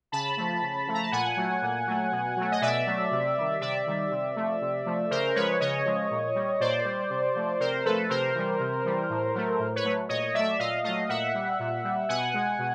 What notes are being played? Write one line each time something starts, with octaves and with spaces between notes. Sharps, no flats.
C#3 A5 B5
F3 A3
C#3
F3 A3
A#5
A5
A#2 F#5 G#5
F#3 A3
A#2
F#3 A3
B2
F#3 A3
D#5
B2 D5 E5
F#3 A3
C3
D#3 G3
C3 D5 E5
D#3 G3
C3
F3 A3
C3
F3 A3
C#3 A#4 C5
F3 G#3 B4 C#5
C#3 C#5 D#5
F3 G#3
A#2
G3
A#2 C5 D5
G3
C3
F3 A3
C3 A#4 C5
F3 A3 A4 B4
C3 A#4 C5
E3 G3
C3
E3 G3
A2
F#3 A3
A2
B4 C#5
F#3 A3
A#2 C#5 D#5
F#3 A3 D5 E5
A#2 D#5 F5
F#3 A3 D#5 F5
A#2 E5 F#5
G3
A#2
G3
B2 F#5 G#5
G#3
B2